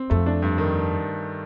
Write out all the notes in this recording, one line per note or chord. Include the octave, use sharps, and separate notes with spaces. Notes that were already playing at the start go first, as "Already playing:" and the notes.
Already playing: C4
F2 A3
D4
G2
D#3